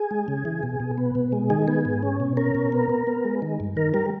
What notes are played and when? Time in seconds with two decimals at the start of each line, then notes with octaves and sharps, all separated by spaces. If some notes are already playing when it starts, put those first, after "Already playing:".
Already playing: G#4
0.11 G#3
0.28 C#3
0.45 E3
0.63 B2
0.80 B2
0.98 B3
1.15 B2
1.32 G#3
1.50 D#3 G#4
1.68 B3 G#4
1.85 G#2
2.03 C#4
2.20 B2
2.37 C#4 A#4
2.55 B2
2.72 B3
2.89 B3
3.07 B3
3.25 G#3
3.42 D#3
3.60 G2
3.77 D#3 A#4
3.94 G3 A#4